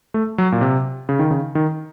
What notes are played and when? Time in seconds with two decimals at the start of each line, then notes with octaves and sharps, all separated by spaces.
0.14 A3
0.38 F#3
0.52 A#2
0.61 C3
1.09 C#3
1.19 D#3
1.31 C#3
1.55 D#3